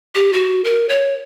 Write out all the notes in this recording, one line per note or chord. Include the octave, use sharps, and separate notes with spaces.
G4
F#4
A#4
C#5